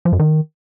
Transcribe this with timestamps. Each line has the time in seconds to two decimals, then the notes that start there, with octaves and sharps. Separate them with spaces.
0.05 F3
0.12 F#2
0.19 D#3